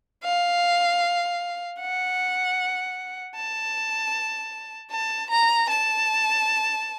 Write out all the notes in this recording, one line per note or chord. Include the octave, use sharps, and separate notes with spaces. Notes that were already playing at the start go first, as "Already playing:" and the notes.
F5
F#5
A5
A5
A#5
A5